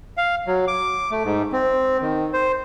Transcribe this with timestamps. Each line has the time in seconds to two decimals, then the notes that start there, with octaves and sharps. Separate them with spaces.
0.17 F5
0.47 F#3
0.67 D6
1.11 A3
1.25 G#2
1.52 C4
2.01 D#3
2.33 C5